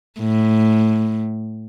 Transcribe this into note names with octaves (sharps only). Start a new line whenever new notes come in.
A2